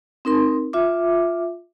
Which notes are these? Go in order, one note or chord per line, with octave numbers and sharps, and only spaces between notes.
C4 D#4 A#4 C6
F4 E5 D6